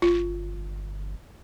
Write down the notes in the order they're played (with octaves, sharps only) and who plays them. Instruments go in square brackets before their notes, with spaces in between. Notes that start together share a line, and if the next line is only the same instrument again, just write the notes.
[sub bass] G1 [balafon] F4